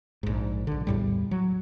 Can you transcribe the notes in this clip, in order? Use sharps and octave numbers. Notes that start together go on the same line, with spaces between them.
A#1 G#2
B1 D3
E2 A2 G3
F#3